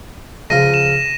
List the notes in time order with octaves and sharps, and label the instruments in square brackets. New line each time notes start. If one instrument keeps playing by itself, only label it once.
[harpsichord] C#2 F3 F5 [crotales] A#6 D#7
[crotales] E7